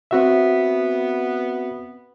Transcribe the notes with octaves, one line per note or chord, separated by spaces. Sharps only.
B3 C4 F#4 E5